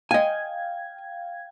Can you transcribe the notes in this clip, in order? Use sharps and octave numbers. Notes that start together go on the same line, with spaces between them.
D#5 F5 G5 G#5 G#6